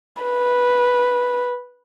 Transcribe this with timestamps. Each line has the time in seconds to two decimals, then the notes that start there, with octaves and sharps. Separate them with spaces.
0.23 B4